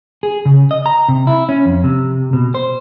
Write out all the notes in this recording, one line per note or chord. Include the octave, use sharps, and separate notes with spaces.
G#4
C#3
D#5
A#5
C3
E4
C#4
F2
C3
B2
C5